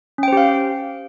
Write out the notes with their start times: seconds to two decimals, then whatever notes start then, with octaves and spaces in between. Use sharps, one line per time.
0.18 C#4
0.23 G5
0.28 C5
0.32 G4
0.37 F5